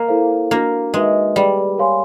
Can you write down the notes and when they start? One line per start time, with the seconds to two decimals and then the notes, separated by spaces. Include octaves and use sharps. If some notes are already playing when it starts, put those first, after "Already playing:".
Already playing: A#3
0.08 E4 A4 C5 F5
0.51 A#3 D4 F#4 A#4
0.94 G#3 D#4 F#4 B4 E5
1.36 G3 G#4 B4 D5
1.78 A#4 C#5 F5 G#5 C6